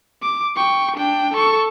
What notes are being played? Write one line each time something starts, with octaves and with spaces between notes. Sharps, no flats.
D6
G5 C#6
D4 G5
A4 C#6